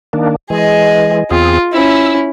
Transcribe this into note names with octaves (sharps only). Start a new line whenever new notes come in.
D#3 A#3 D4
E3 G#3 G#4 D#5
E2 C4 F4 G#4
C#4 E4 E6